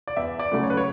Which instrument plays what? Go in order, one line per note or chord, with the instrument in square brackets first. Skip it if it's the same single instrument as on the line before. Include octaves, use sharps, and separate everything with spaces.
[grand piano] D5
E2 E5
D5
C#3 F#3 A3
C#5
B4
C#5